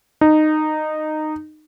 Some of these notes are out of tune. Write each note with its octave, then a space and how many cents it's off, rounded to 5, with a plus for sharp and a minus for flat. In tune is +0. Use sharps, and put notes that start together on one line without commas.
D#4 -15